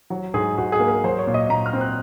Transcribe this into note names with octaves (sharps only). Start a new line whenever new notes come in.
F#3
G#2 G#4
G#2 F#4
G#4
A#3
A#4
F#3 C5
C#5
A#2
D#5
A#2 A#5
F6
C4
F#6